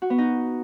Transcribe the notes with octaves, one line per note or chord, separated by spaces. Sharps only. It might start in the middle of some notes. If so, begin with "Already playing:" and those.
F#4
B3
D#4